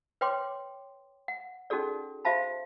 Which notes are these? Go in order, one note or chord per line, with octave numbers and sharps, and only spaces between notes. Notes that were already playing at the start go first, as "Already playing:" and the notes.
B4 C#5 G5 C6 D6
F#5
C#4 D#4 F#4 G#4 A4 D5
F#4 C5 E5 F5 A5 B5